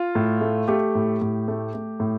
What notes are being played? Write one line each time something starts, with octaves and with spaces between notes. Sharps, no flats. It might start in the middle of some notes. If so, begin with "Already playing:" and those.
Already playing: F4
A2
A3
A3 G4
A2
A2
A3
A3
A2